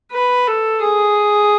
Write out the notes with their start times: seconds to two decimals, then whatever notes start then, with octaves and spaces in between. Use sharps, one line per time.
0.12 B4
0.47 A4
0.82 G#4